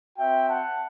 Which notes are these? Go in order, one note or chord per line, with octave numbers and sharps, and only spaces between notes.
C4 F#4 E5 G5
F#5 A5